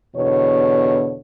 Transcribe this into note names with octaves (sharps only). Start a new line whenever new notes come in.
E2 B2 D3 C#5